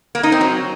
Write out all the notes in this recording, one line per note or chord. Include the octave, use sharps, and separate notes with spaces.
A#3
D#4
C4
F#3